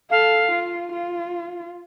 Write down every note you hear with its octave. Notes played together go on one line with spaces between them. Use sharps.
A4 F5
F4
F4